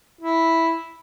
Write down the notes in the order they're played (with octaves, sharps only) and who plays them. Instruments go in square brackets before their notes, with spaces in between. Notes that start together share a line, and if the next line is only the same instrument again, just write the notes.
[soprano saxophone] E4